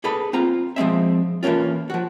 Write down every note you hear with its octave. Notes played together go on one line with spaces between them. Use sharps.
D4 G#4 A4 B4 B5
C4 F4 A#5
F3 G#3 C4 E5
E3 A3 A#3 C#4 F4
F3 F#4